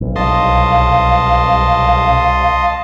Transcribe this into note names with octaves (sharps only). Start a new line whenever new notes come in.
B1
C2 D#5 F5 A5 C6